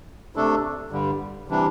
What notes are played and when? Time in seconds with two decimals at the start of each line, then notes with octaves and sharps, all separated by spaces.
0.36 C3 A3 D4 A4
0.91 G2 D3 G3
1.48 C3 E3 G3 D4